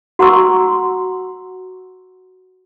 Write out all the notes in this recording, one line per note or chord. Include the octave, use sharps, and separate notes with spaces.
F#4 F#5 A#5 C6 C#6 E6